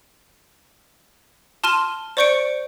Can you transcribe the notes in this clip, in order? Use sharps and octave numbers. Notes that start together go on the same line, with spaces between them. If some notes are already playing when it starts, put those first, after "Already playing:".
A5 C6 F6 D#7 E7 G7
C5 D5 C#6 G6 C#7 D7